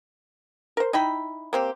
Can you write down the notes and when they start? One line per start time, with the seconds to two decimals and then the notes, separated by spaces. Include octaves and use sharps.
0.77 A#4 C5
0.93 D#4 E4 G5 B5
1.53 A#3 C4 G4